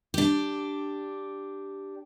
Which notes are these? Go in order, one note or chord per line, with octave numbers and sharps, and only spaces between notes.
D4 G4